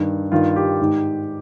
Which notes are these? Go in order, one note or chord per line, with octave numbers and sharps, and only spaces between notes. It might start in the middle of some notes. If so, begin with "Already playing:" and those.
Already playing: G2 D#3
G2 D#3 F4
G4
G#2 D#3